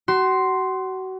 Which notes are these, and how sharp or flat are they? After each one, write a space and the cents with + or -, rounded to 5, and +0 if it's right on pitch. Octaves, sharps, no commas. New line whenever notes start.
F#4 +30 C6 +0